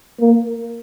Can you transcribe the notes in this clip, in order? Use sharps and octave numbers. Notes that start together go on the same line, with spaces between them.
A#3